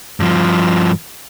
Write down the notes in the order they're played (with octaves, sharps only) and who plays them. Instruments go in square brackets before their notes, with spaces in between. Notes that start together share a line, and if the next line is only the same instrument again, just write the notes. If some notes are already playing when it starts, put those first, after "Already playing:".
[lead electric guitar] G2 F3